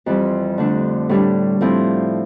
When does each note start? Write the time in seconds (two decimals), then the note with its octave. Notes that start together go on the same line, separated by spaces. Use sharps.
0.06 F2 E3 G3 C4
0.58 D3 A3 D4
1.09 A2 G3 D4
1.61 A2 F3 C4 E4